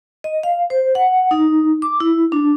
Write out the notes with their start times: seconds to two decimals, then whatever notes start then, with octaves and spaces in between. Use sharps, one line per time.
0.24 D#5
0.43 F5
0.70 C5
0.95 F#5
1.31 D#4
1.82 D6
2.00 E4
2.32 D4